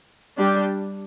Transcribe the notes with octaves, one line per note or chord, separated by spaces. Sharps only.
G3 D4 G4